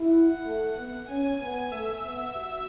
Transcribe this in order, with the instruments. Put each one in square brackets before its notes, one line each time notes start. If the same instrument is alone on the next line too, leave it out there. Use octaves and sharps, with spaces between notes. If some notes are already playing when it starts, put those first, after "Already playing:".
Already playing: [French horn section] E4
[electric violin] F#5
[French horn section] A3
B3
[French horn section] C#4 [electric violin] G#5
[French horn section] B3
[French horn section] A3 [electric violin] E5
[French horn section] B3
F#4